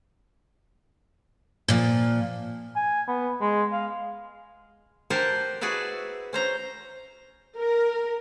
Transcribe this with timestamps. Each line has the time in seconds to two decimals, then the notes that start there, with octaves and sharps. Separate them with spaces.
1.68 A#2 F3
2.76 G#5
3.08 B3
3.41 G#3
3.72 F5
5.10 G4 A#4 C5 F#5 G#5 A5
5.61 E4 F#4 G#4 B4 D5 E5
6.33 C#4 C5 A#5
7.57 A#4